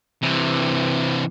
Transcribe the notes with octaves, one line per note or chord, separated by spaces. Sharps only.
C3 E3